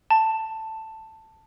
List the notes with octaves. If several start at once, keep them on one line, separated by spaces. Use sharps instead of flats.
A5